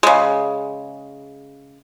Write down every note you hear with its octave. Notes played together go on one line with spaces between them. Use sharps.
C#3 G#3